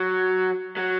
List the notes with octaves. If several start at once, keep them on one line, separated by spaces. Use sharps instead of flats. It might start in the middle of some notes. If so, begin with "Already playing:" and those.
Already playing: F#3
F#3